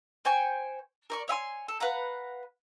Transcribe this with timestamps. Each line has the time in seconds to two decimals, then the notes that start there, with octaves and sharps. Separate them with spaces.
0.25 C5 G5 G#5 C#6
1.10 A#4 D5 C#6
1.28 C#5 E5 G#5 C6
1.68 A4
1.80 B4 F5 F#5 A#5